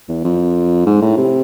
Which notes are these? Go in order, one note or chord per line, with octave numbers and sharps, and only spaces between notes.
E2
F2
G#2
A2
C3